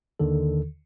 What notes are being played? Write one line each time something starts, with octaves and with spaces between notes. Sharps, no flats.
D#2 D3 D#3 A4